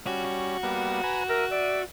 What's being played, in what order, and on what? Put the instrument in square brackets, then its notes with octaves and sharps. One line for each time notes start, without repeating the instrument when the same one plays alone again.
[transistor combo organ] G3 C#4 [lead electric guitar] F#4
[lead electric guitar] F#4
[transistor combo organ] G3 A#3 B3
B4 G#5 A#5
[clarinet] A#4 [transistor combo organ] E5 A#5
[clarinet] D5 [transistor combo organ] E5